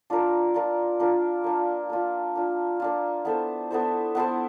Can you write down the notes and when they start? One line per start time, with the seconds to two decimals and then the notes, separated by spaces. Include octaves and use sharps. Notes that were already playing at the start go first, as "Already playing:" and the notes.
0.10 D4 F4 A#4
0.54 D4 F4 A#4
1.00 D4 F4 A#4
1.44 A#3 D4 F4
1.90 A#3 D4 F4
2.35 A#3 D4 F4
2.80 A#3 D4 F4
3.25 B3 E4 A4 C5
3.71 B3 E4 A4 C5
4.15 B3 E4 A4 C5